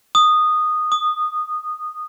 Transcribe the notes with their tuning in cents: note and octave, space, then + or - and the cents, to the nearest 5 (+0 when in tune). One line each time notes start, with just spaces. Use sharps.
D#6 -10
D#6 -20